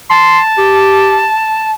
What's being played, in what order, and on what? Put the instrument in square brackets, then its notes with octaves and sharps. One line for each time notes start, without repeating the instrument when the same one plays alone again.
[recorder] A5 [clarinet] C6
[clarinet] G4